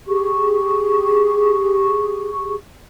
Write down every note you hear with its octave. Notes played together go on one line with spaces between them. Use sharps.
G4 G#4 C#6